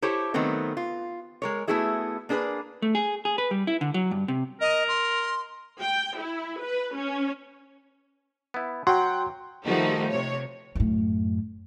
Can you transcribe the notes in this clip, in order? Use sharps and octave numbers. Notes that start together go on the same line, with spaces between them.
E4 G4 A4 C5 C#5
D#3 F#3 A3 B3 C4
F4
G#3 A#4 C#5
A3 B3 E4 F#4 G#4 E5
A#3 D4 G#4 A4 B4
A3
G#4
G#4
B4
G3
E4
D3
F#3
G2
C3
A#4 D#5
C6
G5
E4
B4
C#4
B3 E4
F#3 F#4 F#5 G5 C6
D#3 F3 G3 A3 D#4 F#4
C3 C#5
F#2 A2